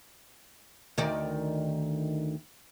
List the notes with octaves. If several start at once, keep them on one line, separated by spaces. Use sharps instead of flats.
D2 D#3 D5